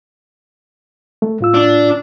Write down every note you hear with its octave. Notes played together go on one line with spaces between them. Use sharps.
A3
A2 F4 E6
D4